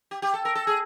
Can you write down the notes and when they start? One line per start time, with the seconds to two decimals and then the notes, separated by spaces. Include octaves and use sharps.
0.11 G4
0.22 G4
0.34 A4
0.45 A#4
0.55 A4
0.67 G#4